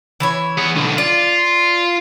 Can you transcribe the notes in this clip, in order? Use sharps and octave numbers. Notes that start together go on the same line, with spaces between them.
E3 E4 C#5
B3 G#4
B1 D3
F4 D5